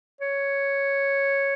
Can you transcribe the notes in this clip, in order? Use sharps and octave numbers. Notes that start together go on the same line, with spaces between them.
C#5